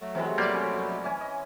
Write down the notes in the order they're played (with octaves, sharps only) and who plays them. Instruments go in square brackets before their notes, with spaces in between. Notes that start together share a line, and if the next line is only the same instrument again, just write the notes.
[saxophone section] F#3 A3
[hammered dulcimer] C3 G#3 [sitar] E3 B3
[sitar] F2 B2 D5 [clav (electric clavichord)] G3 A#3
[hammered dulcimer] C#4 C5
E3 C#4 G#5
D#5